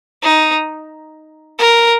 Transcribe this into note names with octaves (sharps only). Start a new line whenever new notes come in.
D#4
A#4